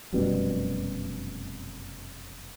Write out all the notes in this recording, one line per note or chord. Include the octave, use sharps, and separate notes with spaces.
F1 F#2 B2 G3